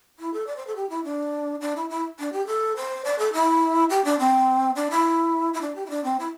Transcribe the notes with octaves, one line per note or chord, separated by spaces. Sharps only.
E4
A4
D5
C5
A4
G4
E4
D4
D4
E4
E4
D4
G4
A4
C5
D5
A4
E4
G4
D4
C4
D4
E4
E4
D4
G4
E4
D4
C4
E4